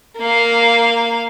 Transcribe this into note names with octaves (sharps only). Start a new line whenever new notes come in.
A#3 F5